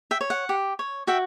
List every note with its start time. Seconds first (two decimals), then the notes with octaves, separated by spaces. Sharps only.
0.11 E5 G5
0.21 C#5
0.30 F#5
0.49 G4
0.79 C#5
1.07 F#4 E5 G5